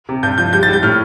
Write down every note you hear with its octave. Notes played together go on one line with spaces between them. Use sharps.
C3
G2 G6
F3 G6
G3 G6
A6
G3 G6
A2 F6